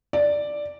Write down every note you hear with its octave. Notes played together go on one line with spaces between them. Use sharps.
D5